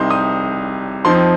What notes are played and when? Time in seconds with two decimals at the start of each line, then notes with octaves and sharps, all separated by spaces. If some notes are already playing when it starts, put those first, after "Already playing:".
Already playing: C2 C3 G3 D#4 C6
0.10 D#6
1.05 F2 F3 C4 D#4 C6